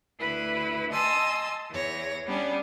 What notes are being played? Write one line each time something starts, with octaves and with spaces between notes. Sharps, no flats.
D2 E4 B4
D#5 G#5 A5 C6 D#6 E6
E2 C#5 A#6
G3 B3 C#4 D4